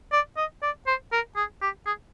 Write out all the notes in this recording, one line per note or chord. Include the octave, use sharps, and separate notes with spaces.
D5
D#5
D5
C5
A#4
G#4
G4
G#4